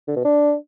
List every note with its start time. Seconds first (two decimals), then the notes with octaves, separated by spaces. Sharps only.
0.07 D3
0.16 B2
0.25 D4